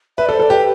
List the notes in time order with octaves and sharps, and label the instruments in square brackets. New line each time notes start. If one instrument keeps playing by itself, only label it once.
[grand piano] B4 [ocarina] E5
[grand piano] A4 [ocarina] D5
[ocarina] C5
[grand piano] A4
[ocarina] D5
[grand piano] G4 [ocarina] B4